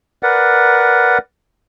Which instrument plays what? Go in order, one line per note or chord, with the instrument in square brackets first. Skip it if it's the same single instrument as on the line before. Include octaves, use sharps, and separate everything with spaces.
[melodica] A#4 B4 D5 F#5